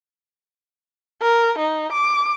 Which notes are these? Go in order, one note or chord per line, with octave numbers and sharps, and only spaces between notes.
A#4
D#4
D6